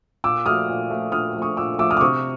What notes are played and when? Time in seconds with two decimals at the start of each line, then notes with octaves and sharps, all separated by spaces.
0.24 A#2 D6 E6
0.46 F3 A3 D#6 F6
0.69 A#2
0.90 F3 A3
1.12 A#2 D#6 F6
1.34 F3 A3
1.42 C#6 D#6
1.57 A#2 D6 E6
1.79 F3 A3 D6 E6
1.91 D#6 F6
1.97 D6
2.01 C3 C#6 D#6